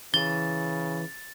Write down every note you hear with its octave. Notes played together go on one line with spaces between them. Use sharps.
C#3 E3 A6 G7